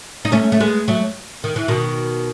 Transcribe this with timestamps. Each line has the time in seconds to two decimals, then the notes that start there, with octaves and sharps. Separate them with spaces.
0.25 D#4
0.32 A3 C#4
0.52 A3
0.60 G#3 B3
0.88 F#3 A3
1.44 D#3
1.56 E3
1.68 B2 D#3